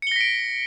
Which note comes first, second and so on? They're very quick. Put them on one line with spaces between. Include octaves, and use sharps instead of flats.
C#7 G7 A#6 B6 D7